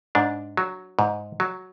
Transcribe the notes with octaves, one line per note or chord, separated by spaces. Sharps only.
G#2 D4
F#3
G#2
F#3